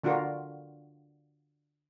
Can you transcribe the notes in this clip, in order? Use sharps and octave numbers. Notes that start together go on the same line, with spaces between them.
D3 D4 F4 F#4 A#4